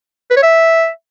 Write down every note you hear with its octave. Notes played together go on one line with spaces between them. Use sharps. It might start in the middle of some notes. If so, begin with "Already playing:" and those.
B4
C#5
E5